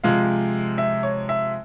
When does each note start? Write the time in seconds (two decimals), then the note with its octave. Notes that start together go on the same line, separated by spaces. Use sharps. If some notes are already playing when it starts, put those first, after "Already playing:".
0.04 C3 F3 G#3 F5
0.78 E5
1.03 C#5
1.29 E5